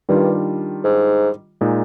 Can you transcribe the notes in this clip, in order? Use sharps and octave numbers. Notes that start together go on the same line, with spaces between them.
G2 D#3 G3 D4 F4
G#2
A#2 G#3 D#4